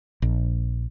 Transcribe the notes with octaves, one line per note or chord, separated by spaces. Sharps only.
A#1